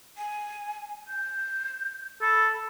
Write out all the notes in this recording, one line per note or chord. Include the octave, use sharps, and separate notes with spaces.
G#5
G6
A4 B5